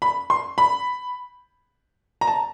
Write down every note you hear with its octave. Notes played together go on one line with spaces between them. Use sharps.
B5
C6
B5
A#5
A5